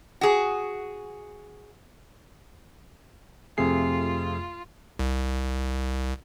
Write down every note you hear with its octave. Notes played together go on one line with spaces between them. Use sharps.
F#4 G#4
F2 C3 A3 F4 G#4 C7
C2